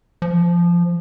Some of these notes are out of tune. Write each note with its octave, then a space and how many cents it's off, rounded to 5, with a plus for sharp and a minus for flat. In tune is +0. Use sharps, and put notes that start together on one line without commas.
F3 -10